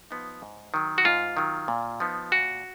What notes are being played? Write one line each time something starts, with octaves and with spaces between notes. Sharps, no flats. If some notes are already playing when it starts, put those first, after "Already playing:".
F3 B3 D#4
G#2
D#3 F#3
F#4
G#2 F4
D#3 F#3
A#2
F3 B3 D#4
A#2 F#4